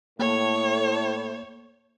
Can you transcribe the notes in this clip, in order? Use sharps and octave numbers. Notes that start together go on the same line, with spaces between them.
A2 A#3 C#5